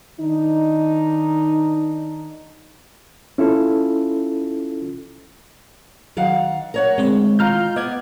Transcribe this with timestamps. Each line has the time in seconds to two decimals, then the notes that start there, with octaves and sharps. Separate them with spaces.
0.19 D#3 D4 D#4
3.38 C#4 E4 F4 A4
6.17 D#3 F#3 F5 F#5
6.74 A#4 C#5 F#5
6.98 D2 G#3 C4 C#5
7.39 D#3 F4 A#5 F6 G6
7.76 B3 D#5 D6 G#6